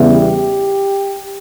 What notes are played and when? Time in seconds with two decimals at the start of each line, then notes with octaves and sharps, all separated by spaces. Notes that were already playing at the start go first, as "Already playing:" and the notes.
Already playing: E2 C#3 G3 B3 E4
0.12 G4